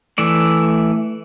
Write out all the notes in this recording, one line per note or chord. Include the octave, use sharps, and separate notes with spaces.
E3 A3 D5